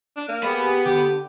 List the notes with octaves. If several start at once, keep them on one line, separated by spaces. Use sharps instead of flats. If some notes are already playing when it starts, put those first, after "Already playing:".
D4
A#3
B3 G4 G#4 B4
D3 G4